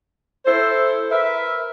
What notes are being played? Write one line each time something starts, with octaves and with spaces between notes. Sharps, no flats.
E4 A4 C5
A#4 B4 E5